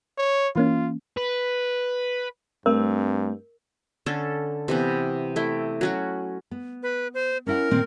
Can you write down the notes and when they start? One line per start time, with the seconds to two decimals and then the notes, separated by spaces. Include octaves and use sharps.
0.18 C#5
0.56 E3 A#3 C#4 F4
1.17 B4
2.66 G2 A3 C4 A#4
4.06 D3 C#4 A4
4.68 C3 E3 B3
5.36 A3 E4 G5
5.81 F#3 C#4 F#4
6.51 B3
6.83 B4
7.14 C5
7.47 C#4 E4 A#4 F#5
7.71 A#2 D#3 C4